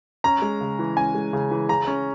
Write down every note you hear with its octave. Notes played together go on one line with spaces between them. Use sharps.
C#4 A#5
G#3
C#3
E3
C#4 G#5
G#3
C#3
E3
C#3 A#5
C#4